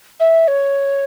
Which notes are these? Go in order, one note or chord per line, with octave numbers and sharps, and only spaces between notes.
E5
C#5